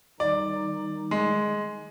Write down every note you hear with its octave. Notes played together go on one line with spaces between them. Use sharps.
D#3 G3 D#4 D5
G#3